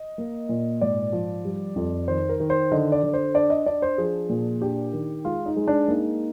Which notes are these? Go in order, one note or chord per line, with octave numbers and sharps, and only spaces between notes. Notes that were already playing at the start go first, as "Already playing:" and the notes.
Already playing: D#5
A#3
A#2
G#2 D5
F3
G3
F2
D#3 C5
A#4
D#3
C5
D3 D#5
D5
D3
C5
D4 D5
D#5
D4 D5
C5
F3 G#4
A#2
D4 G4
D#3
G#3 F4
D#4
G#3
D4
A#3 D#4